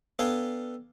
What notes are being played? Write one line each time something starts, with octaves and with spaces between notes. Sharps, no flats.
B3 D4 A4 F5 G5 G#5